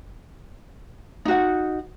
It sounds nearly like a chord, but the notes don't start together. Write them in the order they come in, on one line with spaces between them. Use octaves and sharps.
D#4 F#4 F#5